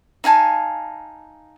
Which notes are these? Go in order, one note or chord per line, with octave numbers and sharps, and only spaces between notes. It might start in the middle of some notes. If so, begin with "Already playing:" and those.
D#4 F5 G#5 A5